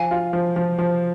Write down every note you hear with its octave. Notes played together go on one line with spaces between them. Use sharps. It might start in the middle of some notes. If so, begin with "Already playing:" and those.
Already playing: F3 F5 G#5
F4
F3
F3
F3